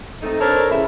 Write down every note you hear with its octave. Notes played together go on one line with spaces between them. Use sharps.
A3 C4 D#4
D4 A4 A#4 C5 C#5
C#3 E4